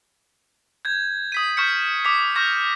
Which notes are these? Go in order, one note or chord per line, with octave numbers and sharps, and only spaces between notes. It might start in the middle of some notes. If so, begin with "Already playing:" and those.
G6 G#6
D#6 B6 D#7
C#6 F6 G6 B6 C#7
D6 B6
C#6 F6 G6 A#6